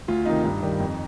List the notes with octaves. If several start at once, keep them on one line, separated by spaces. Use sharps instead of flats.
D2 F4
C3 D#3 D#4
G2 D#4
D#3 G3
F2